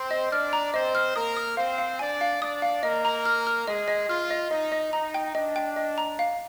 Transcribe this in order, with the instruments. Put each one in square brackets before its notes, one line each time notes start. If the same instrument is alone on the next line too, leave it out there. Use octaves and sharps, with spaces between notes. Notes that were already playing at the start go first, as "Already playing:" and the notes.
Already playing: [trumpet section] C4 C5
[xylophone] D#5
[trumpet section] D4 D5 [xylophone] F6
[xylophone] A#5
[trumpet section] C4 C5 [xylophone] D#5
[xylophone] F6
[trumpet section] A#3 A#4 [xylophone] D#6
[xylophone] D#6
[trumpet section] C4 C5 [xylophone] F5
[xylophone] F5
[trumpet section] D4 D5 [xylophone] G#5
[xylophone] F5
[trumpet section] D4 D5 [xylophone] D#6
[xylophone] F5
[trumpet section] A#3 A#4 [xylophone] D#5
[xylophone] A#5
F6
F6
[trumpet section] G#3 G#4 [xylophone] D#5
[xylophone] D#5
[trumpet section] F4 [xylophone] F6
[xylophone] D#5
[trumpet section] D#4 [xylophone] D#5
[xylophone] D#5
[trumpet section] D#4 [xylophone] A#5
[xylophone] G5
[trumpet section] D4 [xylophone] D#5
[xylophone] G5
D#5
A#5
F5